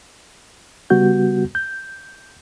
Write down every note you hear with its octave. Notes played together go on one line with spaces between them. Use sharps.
C#3 G3 B3 F#4 G6
G6